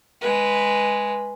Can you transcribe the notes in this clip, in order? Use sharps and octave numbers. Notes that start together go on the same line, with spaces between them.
G#3 B4